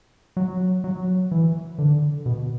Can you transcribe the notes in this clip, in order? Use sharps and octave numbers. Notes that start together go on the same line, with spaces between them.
F#3
F#3
E3
D3
B2